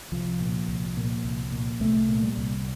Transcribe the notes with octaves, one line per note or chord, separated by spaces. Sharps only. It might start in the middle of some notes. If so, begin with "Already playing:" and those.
C2 F3
A#2
C2
A#2
C2
A#2
C2 A3
A#2
G3
C2